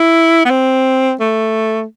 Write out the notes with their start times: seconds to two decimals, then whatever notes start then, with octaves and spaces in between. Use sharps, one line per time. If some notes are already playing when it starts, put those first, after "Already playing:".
Already playing: E4
0.45 B3
0.50 C4
1.20 A3